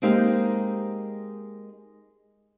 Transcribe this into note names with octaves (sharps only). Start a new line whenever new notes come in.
G#3 A#3 C4 D#4 G4